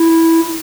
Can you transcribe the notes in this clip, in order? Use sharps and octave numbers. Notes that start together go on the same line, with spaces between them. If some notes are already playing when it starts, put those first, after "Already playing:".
Already playing: E4